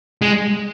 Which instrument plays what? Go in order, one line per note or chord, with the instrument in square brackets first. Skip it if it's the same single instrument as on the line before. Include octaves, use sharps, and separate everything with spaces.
[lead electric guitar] G#3